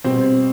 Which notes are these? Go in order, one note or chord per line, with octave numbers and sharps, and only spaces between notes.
B2 G3 C4